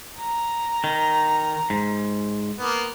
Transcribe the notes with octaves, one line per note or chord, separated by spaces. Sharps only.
A#5
D#3
G#2
A#3 B3